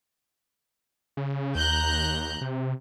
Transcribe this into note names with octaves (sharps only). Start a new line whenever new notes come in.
C#3
D#2 A#5 F#6 G6
C3